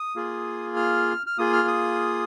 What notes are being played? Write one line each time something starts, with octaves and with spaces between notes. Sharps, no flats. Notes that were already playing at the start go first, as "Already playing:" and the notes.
Already playing: D#6
A#3 F4 G#4
F6
F6
A#3 F4 G#4 D#6
F6
D#6